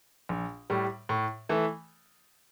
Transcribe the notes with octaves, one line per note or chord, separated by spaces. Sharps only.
A#1
A2 G3
A2
E3 A3